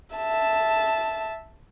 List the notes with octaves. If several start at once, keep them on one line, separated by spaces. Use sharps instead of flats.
E5 A5